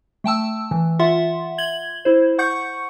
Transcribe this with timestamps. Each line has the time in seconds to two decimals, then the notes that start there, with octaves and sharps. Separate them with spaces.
0.24 A3 G5 A5 E6
0.71 E3
0.99 F4 E5 F#5 C6
1.58 G#6 F#7 G7
2.05 E4 C5
2.39 F#5 C#6 G6 C#7